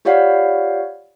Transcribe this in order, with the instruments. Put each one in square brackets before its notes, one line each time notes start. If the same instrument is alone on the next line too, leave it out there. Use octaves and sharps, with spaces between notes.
[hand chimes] F4 G4 C#5 D5 F5 F#5